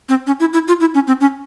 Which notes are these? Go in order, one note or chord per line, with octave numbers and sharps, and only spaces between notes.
C4
C#4
E4
E4
F4
E4
C#4
C4
C#4